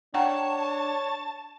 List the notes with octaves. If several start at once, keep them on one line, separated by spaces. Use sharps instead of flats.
D4 C#5 F#5 G5 A5 A#5